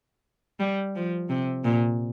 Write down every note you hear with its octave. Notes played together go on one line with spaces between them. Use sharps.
G3
F3
C3
A#2